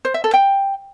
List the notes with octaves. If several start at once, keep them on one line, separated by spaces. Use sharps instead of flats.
C5
E5
A4
G5